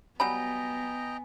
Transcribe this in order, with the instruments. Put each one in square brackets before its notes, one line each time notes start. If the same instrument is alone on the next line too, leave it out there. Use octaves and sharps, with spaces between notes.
[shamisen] F#3 G3 B5 [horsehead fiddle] B3 [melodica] D#5 G5 A#5 [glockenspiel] G#5